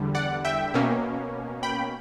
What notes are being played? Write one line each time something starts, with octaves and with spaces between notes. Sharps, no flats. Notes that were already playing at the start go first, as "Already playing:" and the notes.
Already playing: E2 D3 G3
D5 F#5
E5 G5
B2 A#3 C#4
G5 B5